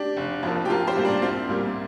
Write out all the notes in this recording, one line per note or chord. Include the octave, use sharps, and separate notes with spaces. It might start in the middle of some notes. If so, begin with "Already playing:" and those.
Already playing: D4 G4
F1
F2 F3 A#3
G4
A#1 F4 A#4
G4 C5
A#2 G3 A#3
D4
C2 C4 F4
A#2 G3 A#3